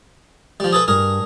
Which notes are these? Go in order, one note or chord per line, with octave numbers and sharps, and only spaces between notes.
F3 G3
G#4 A4 B4
G2 G#4 A#4